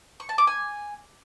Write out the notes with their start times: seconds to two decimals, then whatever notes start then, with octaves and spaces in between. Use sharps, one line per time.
0.20 C#6
0.29 A5
0.38 D6
0.47 G#5